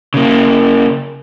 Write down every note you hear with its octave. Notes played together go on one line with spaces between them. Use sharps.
C#3 A#3